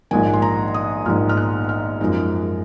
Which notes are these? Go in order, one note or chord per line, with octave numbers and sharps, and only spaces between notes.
A#1 G#2 D#3 G#5
C6
A#5
D#6
A#1 G#2 D#3 F6
F6
F#6
F6
F#2 F3 G#3 D#4